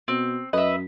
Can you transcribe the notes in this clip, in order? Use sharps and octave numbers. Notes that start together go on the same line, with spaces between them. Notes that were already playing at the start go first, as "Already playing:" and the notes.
B2 C4
F#2 B4 D#5 E5